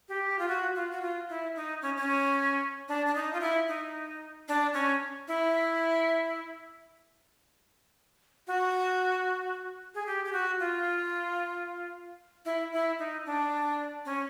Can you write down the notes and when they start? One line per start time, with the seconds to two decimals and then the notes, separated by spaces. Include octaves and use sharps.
0.09 G4
0.39 F4
0.48 F#4
0.75 F4
0.91 F#4
1.02 F4
1.29 E4
1.56 D#4
1.82 C#4
1.97 C#4
2.89 D4
3.06 D4
3.15 D#4
3.33 F4
3.41 E4
3.68 D#4
4.48 D4
4.74 C#4
5.28 E4
8.47 F#4
9.95 G#4
10.06 G4
10.25 G4
10.33 F#4
10.60 F4
12.45 E4
12.73 E4
12.99 D#4
13.26 D4
14.05 C#4